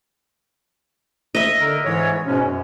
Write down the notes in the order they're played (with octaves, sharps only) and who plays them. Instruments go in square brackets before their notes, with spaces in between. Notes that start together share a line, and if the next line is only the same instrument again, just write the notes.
[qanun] D#5 E5
[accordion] D3 A#4
G#2 E3 C#5
G#2 B2 C#4
F#2